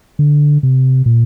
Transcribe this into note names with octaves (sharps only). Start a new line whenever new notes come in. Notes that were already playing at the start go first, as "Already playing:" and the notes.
D3
C3
A#2